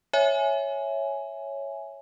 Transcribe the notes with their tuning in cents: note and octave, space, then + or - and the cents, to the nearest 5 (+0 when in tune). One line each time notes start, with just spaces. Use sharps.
C#5 +0 E5 +0 G#5 +5